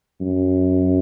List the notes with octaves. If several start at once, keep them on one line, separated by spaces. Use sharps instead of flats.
F#2